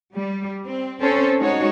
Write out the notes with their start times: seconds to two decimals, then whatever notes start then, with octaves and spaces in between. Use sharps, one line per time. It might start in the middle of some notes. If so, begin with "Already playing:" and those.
0.15 G3
0.66 C4
1.01 C4 C#4 A4 C5 C#5
1.37 G#3 D#4 F#4 C#5